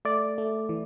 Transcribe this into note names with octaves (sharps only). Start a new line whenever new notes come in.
A3 D5
A3
E3